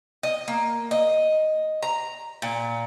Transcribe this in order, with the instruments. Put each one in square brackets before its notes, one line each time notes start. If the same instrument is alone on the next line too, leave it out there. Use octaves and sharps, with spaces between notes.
[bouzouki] D#5
A#3
D#5
A#5
A#2